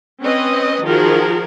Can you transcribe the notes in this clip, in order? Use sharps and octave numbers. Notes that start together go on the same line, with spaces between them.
C4 C#4 B4 D#5
D#3 F3 F#4 G#4 A#4